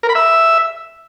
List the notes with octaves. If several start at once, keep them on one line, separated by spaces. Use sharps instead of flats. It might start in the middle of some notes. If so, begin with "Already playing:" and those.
A#4
B5
E5